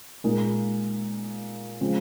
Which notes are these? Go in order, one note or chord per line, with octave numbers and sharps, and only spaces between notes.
A#2 G#3 D#4 A#4
C#3 F3 G#3 C4